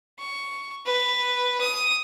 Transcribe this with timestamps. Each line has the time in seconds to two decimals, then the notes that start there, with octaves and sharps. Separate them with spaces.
0.19 C#6
0.86 B4
1.61 D#6